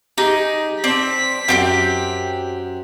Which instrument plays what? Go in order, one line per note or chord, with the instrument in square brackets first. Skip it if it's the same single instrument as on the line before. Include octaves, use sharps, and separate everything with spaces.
[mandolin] D#4 [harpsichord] G4 G#4
[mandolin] C4 [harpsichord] D5 A5 [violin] B6
[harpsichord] F#2 [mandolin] C4 F4 G4